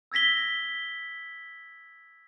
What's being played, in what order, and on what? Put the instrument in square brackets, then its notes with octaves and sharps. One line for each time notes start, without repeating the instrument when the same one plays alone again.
[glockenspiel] E6 G#6 A#6 B6 G7